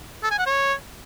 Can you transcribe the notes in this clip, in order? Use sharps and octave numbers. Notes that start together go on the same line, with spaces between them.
A4
G#5
F#5
C#5